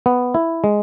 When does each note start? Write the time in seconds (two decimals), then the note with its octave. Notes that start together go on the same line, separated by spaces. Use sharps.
0.06 B3
0.34 E4
0.64 G#3